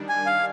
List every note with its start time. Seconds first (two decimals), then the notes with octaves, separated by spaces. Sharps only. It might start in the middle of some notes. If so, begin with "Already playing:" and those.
Already playing: D#3 G3 D4
0.09 G#5
0.26 F5